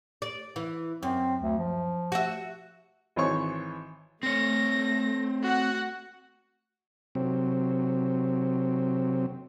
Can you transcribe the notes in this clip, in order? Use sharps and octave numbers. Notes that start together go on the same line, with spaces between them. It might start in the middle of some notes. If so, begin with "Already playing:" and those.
D5
E3
F#2 C4
D2
F3
F#4 E5
G#1 E3 C4 C#5 C#6
A3 C4 C#5 A#6
F#4 F#5
C3 F#3 C4